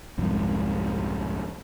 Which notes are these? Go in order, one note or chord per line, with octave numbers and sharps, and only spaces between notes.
C2 F2 G#2